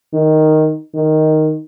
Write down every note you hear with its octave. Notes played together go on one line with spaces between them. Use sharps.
D#3
D#3